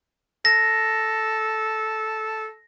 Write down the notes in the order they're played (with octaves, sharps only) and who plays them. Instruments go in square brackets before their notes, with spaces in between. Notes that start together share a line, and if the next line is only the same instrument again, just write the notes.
[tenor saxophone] A4 [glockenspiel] A#6